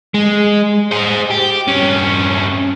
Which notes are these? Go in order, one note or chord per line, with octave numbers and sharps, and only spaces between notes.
G#3
G#4 C5
G4
G2 C#4